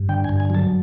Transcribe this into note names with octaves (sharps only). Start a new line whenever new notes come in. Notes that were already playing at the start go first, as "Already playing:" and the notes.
Already playing: G2
D3 G5
G#5
G2
G#5
F#3 A5